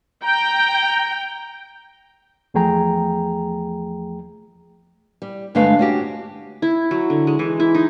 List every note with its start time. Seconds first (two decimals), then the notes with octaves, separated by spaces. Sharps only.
0.24 G5 A#5
2.54 E2 F3 A3 G#4 G5 A#5
5.22 G3
5.55 G2 D3 G#3 A3 B4 F5
5.79 C#4 F#4 G4
6.62 E4
6.91 F#3
7.10 D3
7.27 G#3
7.39 E3
7.60 E4
7.75 D#4